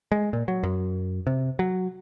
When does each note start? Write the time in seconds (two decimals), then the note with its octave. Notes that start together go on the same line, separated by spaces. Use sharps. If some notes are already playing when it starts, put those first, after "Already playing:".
0.12 G#3
0.33 A#2
0.48 F#3
0.63 F#2
1.27 C3
1.59 F#3